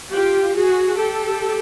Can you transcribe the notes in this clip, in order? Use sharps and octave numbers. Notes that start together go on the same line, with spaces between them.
F4 G4
F#4 G#4
G4 A4